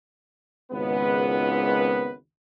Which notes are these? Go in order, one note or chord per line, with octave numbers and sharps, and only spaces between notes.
G#1 C#2 B3 B4